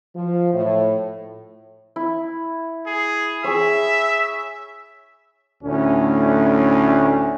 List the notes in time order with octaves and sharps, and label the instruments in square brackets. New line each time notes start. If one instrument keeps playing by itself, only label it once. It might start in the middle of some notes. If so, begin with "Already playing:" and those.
[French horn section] F3
A2
[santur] E4
[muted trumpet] G#4
[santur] G#4 C#5 [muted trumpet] E5
[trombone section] D2 A2 C#4